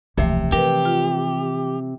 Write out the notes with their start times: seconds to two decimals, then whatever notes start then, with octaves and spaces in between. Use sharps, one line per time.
0.18 E1 C#2 C3 E3 F3 A3
0.52 E3 G4 A#4 B4
0.85 F4